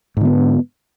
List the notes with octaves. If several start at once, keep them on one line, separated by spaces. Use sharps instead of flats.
G#2 D3 B3